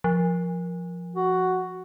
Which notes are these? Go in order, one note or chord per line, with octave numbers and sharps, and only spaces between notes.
F3
F#4